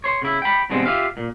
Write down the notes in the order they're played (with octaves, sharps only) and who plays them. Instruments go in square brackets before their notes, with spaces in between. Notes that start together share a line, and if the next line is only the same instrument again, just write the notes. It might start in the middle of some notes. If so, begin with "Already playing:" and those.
[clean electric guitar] C#5 C6
C#3 E4
G5 B5
E2 G2 B2 G#3 C4
F4 G4 E5 F5
A#2